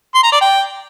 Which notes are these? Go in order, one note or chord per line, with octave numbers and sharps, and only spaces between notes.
C6
A#5
D5
G5